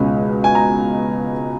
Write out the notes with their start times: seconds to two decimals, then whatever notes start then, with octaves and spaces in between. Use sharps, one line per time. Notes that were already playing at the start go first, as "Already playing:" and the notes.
Already playing: C#2 B2 G#3 C#4
0.44 G#5
0.55 A#5